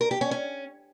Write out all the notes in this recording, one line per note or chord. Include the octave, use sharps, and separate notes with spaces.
A#4
G4
C#4
C#4